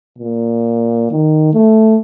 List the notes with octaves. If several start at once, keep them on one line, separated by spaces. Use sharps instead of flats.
A#2
D#3
A3